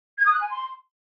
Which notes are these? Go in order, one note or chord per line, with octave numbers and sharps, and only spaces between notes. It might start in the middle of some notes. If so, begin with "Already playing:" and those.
G#6
D#6
F#6
G#5
C6